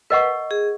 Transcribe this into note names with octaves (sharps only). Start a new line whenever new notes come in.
A#4 B4 D#5 F#5 C#6
G#4